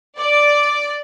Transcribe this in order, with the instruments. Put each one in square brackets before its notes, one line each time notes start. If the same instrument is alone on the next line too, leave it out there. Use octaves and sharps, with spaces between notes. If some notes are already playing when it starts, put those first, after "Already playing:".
[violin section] D5 [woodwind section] D6